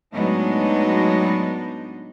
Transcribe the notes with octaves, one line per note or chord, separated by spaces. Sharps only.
A2 F#3 G#3 B3 D4 D#4